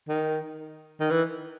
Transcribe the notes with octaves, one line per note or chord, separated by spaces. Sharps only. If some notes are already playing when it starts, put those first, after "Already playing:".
D#3
D#3
E3